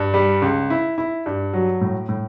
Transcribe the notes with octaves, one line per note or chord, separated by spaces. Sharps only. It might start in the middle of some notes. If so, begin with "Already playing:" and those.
Already playing: G2
G3
C#2
E4
E4
G2
F#3
A2
A2